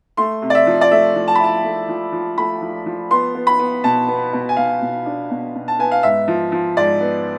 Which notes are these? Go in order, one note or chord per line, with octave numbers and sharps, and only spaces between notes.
A3 C6
C3
D5
E5
F3
D5
A3 E5
F3
A5
B5
E4 A5
A3
F3
F3
A3 B5
F3
F3
B3 C6
B3
B5
B3
B2 A5
B3
B2
G#5
B2 F5
B2
D4
B2
B2
A5
B3 G#5
F5
G#2 E5
F3
F3
G#2 D5
B3